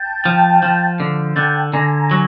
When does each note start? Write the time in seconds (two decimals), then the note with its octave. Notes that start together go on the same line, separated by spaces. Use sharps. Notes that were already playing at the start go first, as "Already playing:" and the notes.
Already playing: G5 A5
0.25 F3
0.63 F3
1.00 D3
1.36 D3 G5 A5
1.73 D3 G#5 A#5
2.11 F#3